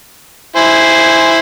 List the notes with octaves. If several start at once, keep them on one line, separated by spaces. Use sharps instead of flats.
E4 C5 G#5